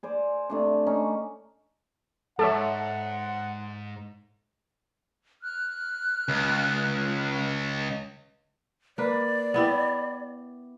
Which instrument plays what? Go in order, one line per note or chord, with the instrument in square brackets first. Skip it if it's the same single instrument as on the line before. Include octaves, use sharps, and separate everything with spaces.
[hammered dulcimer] G#4 C5 D5
C3 A3 D4
C#4 D#4
[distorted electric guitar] G#2 [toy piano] A4 [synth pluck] C#5 E5 A5 [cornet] F#5
[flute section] F6 F#6
[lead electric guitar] C#2
[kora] A#3 B4 [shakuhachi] D5
[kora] B3 E4 G4